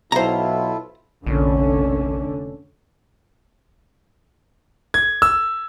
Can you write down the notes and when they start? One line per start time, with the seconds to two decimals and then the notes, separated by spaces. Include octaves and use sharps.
0.12 B1 E4 F4 A4 C5 A#5
1.26 F1 A#1 D3 C#4
4.94 G#6
5.22 E6